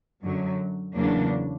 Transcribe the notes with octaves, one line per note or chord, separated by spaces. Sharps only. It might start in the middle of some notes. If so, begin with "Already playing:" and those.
F#2 D3 F#3
E2 C#3 F#3 A#3 D4